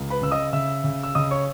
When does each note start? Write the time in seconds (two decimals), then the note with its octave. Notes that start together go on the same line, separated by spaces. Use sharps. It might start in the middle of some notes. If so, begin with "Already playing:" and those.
Already playing: C#2
0.10 B4 B5
0.21 C#3 E6
0.31 D#5 D#6
0.53 C#3 E5 E6
0.84 C#3
1.03 E6
1.15 C#3 D#5 D#6
1.31 C#5 C#6